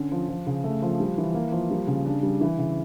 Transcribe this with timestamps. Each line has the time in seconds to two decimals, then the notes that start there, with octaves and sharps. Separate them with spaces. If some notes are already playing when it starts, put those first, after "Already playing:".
Already playing: D3 C#4
0.12 F3
0.29 F3
0.47 C#3
0.64 A3
0.82 F3
1.00 G3
1.18 E3
1.34 A#3
1.52 F3
1.71 G3
1.87 C#3
2.06 D4
2.23 G3
2.41 E3
2.58 C#3